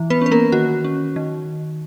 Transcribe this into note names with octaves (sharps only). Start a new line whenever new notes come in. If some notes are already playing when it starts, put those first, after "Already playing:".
Already playing: E3
B3 B4
C#4 B4
A#3 A#4
D#3 F#4
C#4
D#3